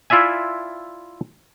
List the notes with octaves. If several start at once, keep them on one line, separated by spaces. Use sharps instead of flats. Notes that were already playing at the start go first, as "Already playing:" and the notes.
E4 F4 D5 E5 G#5